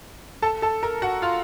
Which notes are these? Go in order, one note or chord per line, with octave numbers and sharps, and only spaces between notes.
A4 A5
A4 A5
A#4 A#5
F#4 F#5
F4 F5